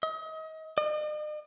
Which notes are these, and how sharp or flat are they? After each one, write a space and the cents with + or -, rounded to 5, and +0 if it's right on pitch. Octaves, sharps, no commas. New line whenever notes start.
D#5 +35
D#5 -45